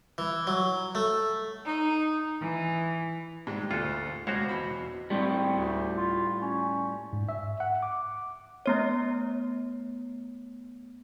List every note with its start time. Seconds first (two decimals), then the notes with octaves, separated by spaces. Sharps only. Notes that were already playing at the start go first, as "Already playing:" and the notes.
0.18 E3
0.47 F#3
0.95 A3
1.65 D#4
2.41 E3
3.47 G#2 G3 G#3
3.71 D2 F4 A4
4.27 C#2 B2 F#4 C5 C#5
4.49 E2 B2 B5
5.10 A2 G3 C4
5.55 D2
5.97 F4
6.42 C#4
7.13 G#2
7.29 E5
7.60 F#5
7.83 D6
8.66 A3 B3 C#5